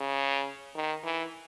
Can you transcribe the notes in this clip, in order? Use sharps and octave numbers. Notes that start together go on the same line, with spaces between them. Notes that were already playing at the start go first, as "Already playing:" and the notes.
Already playing: C#3
D#3
E3